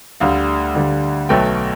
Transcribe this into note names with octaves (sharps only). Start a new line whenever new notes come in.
D2 D3 G3 F5
D2 D3 G3
B1 B2 F#3 A3 G5